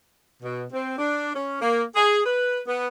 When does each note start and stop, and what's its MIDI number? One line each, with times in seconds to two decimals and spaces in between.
0.43 0.64 47
0.73 0.93 60
0.97 1.31 62
1.33 1.59 61
1.60 1.83 58
1.94 2.19 68
2.24 2.61 71
2.66 2.87 59